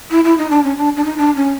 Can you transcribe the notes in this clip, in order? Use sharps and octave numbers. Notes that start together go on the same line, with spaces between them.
E4
E4
D#4
D4
C#4
D4
D4
D#4
D4
C#4